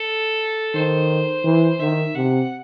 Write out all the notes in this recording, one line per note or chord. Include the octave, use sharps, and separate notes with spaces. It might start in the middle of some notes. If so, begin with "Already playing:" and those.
Already playing: A4
D#3 C5
E3
D#3 E5
C3 F#5